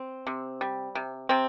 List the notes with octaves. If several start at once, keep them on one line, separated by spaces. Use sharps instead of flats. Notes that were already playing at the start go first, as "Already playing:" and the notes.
Already playing: C4
C3
G3
C3
C3 C4